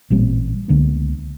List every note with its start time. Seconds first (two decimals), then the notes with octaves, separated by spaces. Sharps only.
0.10 A1 A#2 G3 C4
0.68 C#2 D3 A#3 B3